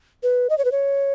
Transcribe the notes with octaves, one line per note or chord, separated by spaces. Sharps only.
B4
D#5
C#5
B4
C#5